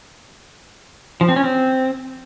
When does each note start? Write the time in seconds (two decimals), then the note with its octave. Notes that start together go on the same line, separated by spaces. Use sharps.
1.21 F3
1.29 C4
1.36 C#4
1.44 C4